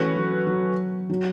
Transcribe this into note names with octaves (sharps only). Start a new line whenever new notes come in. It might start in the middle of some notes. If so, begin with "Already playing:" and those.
Already playing: E3 A3 C#4 F#4 B4
F#3
F#3
F#3